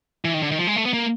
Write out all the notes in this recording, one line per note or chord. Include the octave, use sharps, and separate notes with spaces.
E3
D#3
D3
D#3
F3
G#3
A3
B3
A#3